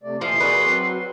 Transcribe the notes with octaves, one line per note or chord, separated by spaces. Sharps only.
C3 A3 D5
D#2 E3 F3 E5 C6
F#4 G#4 A#4 B4 D5
F#3 C4